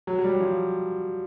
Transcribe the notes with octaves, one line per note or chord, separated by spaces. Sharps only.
F#3
F#3
G3
F3